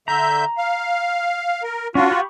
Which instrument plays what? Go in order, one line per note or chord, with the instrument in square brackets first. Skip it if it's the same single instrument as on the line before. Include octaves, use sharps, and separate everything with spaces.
[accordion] D3 E5 G6 [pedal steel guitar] A#5
[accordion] F5
A#4
[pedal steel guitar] C#4 D4 [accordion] F4 F#4
[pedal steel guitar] G4 B5 C#6